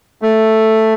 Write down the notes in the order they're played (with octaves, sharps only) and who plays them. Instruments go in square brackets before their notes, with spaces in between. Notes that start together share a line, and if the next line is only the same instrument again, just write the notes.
[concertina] A3